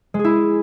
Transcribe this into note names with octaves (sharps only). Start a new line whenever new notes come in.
G#3
G#4
E4